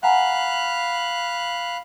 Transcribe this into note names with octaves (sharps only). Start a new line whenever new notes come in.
F5 F#5 G#5 A#5 B5 F#6